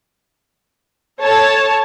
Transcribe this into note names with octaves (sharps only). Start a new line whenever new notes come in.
A4 C#5 A5